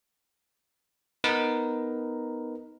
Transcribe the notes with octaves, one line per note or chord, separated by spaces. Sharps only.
B3 D#4 A#4 B4